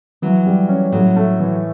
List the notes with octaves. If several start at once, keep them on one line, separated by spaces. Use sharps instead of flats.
E3 F#3
G3
C#4
A2 F#3
A3
E3